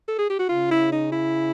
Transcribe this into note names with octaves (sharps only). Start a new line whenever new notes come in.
A4
G#4
G4
F#4
C#3 F4
E4
D#4
E4